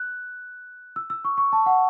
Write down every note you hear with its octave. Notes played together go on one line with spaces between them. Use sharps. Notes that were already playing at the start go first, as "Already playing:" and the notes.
Already playing: F#6
E6
E6
C#6
C#6
A5
F#5